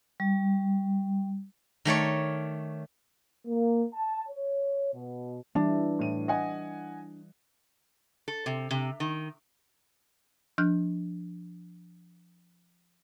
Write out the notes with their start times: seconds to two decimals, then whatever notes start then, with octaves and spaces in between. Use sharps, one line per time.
0.20 G3
1.85 D#3 A3 C#5 D5
3.47 A#3
3.94 A5
4.29 C#5
4.94 B2
5.55 E3 G3 D4 E4
5.99 A2 D#7
6.28 D#5 F#5 G#5
8.28 A4
8.46 C3
8.71 C3
9.00 D#3
10.58 F3 D4 F6 G6